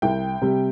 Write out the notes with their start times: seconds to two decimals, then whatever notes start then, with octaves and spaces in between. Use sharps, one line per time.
0.02 C2 G5
0.42 C3 G3